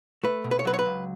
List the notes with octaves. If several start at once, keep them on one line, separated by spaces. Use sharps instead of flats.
A3 B4
B2
B4
C#5
F#3 B4
C#5
B4
C#2